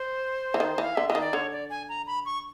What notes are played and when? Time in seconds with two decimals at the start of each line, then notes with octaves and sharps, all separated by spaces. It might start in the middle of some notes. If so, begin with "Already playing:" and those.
Already playing: C5
0.54 E3
0.60 D#3
0.78 E3 F5
0.95 D3 E5
1.09 E3 D#5
1.15 D#3
1.21 D5
1.33 D3 C#5
1.52 D5
1.70 G#5
1.89 A#5
2.07 B5
2.26 C#6